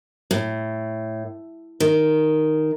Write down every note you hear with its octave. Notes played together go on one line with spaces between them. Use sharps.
A2
D#3